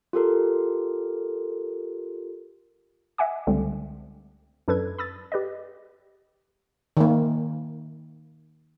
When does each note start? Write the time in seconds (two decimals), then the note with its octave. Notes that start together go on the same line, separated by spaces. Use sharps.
0.13 F4 G4 A4 A#4
3.18 D#5 E5 F#5 G#5 D6
3.47 C#2 D3 G3 A3 C4
4.68 F#2 D4 A4 B4 G#6
4.99 B5 D#6 E6 A6
5.32 G4 B4 D5 D#5
6.97 D#3 A#3